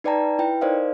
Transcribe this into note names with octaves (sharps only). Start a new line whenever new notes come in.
D#4 B4 D5 G5 A5 A#5
E4 B4 G5
D#4 A#4 C5 D5 D#5 F5